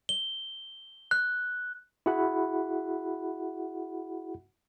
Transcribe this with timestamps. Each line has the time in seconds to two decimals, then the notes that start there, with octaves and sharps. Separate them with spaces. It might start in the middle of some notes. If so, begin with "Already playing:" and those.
0.09 G7
1.11 F#6
2.06 E4 F#4 G#4 F#5 B5